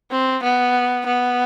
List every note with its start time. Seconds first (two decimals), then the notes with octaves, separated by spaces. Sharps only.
0.11 C4
0.43 B3
1.06 B3